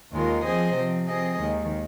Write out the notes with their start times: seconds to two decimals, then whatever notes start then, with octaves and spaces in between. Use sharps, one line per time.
0.12 D#2 D#3 G#3 F4 A#4
0.44 F3 C4 G#4 C5 D#5
0.75 C3 F3 C4
1.07 F3 C4 G#4 D#5
1.39 D#2 D#3 G#3